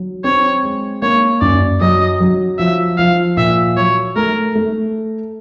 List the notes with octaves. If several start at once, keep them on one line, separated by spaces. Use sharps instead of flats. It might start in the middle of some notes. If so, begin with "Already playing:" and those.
Already playing: F#3
C4 C#5
G#3
A#3 C#5
F#2 D5
F#3 D#5
F#3
F3 E5
F3 F5
A#2 E5
F#3 C#5
A3 A#4
A3